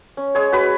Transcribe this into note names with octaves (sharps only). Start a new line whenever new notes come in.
C#4
G#3 G#4 C#5
G#3 F#4 B4